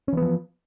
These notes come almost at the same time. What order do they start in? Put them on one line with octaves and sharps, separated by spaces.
C#4 E3 B3 F3